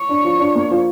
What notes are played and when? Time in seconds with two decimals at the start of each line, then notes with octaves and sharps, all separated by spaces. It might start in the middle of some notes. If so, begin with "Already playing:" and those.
Already playing: C#5
0.09 D4
0.24 F3
0.40 D4
0.55 A#3
0.71 F3